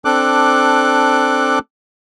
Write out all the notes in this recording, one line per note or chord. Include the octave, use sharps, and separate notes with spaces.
C4 D4 A4 D6 F#6